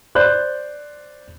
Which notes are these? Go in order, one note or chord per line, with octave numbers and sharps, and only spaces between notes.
C5 D5 F#6 G6